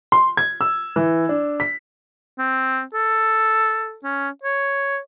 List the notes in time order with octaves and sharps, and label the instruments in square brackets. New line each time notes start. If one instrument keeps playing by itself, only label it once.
[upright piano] C6
G#6
E6
E3
D4
B6
[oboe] C4
A4
C#4
C#5